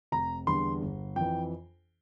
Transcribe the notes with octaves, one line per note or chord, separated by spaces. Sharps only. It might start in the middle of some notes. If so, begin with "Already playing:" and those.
F1 A#5
E2 D3 G3 D4 C6
G1
F2 E3 G5